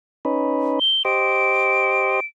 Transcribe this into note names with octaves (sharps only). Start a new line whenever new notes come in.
C#4 D#4 B4
G7
G4 C5 D#5 D7